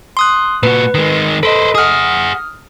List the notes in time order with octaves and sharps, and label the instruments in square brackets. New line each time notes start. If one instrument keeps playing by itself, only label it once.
[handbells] C6 D#6 F#6
[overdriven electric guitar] A#2 F#4 [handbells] B4
[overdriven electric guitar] D#3 G#3
[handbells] A4 D#5 [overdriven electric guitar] B4 C5
[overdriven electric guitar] G#4 F#5 [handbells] D#6 F6